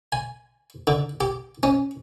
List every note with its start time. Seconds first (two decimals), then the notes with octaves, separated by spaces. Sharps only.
0.12 G#5
0.87 D3
1.21 G4
1.63 C#4